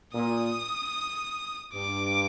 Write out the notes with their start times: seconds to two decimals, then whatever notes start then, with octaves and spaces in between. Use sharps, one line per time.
0.14 A#2 D#6
1.74 G2 D6